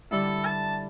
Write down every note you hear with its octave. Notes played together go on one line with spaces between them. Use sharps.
D3 G3 E4 A4
A5